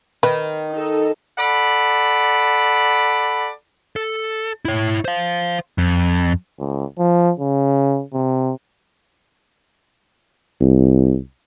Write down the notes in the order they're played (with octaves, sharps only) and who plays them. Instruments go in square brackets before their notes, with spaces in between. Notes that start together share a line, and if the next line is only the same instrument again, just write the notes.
[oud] D#3 [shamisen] B4
[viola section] D#4 A4
[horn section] A4 D5 F#5 B5
[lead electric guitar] A4
E4 C#5
C5 F5
F2
[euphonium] C#2
F3
C#3
C3
[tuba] C2